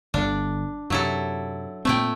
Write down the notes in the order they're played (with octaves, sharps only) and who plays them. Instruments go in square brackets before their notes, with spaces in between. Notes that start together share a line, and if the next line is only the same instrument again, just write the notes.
[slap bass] G1 D3 [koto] D4
[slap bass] F#2 C3 [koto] F#3 E4 A4
[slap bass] A#2 C4 [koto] A3 E4 G5